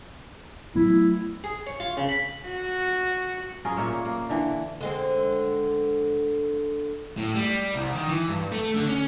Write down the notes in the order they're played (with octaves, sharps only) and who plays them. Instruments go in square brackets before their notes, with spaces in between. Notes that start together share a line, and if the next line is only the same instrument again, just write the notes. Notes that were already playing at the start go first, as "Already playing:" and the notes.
[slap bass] F#3 A3 B3 [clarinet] E4
[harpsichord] G#4
C#5
F4
C#3
B5
[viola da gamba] F#4
[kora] C#4 F4 G#4 A#4
A#2 A#3 C#5 E5
A#3
D3 E3
[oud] D3 G#3 C4
[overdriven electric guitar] A2
G3
C2
D#3
E3
G2
A3
D3
C#4